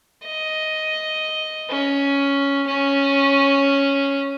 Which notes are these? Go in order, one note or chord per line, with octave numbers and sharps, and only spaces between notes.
D#5
C#4
C#4